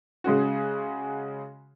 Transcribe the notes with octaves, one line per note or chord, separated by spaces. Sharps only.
C#3 G#3 C#4 F#4